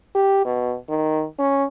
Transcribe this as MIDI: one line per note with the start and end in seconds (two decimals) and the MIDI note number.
0.15 0.44 67
0.45 0.75 47
0.89 1.25 51
1.39 1.64 61